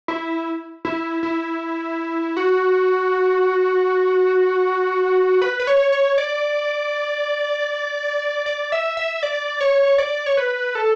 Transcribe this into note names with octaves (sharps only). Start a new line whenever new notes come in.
E4
E4
E4
F#4
B4
B4
C#5
C#5
D5
D5
E5
E5
D5
C#5
D5
C#5
B4
A4